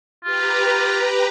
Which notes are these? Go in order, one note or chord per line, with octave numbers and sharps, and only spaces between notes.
F4 G4 B4 A#5